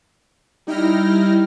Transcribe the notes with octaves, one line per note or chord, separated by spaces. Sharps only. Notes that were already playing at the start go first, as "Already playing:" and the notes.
G3 D#4 E4 G5 F6 A#6